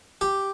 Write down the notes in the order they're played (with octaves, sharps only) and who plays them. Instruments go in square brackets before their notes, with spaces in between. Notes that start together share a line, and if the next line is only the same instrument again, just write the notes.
[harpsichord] G4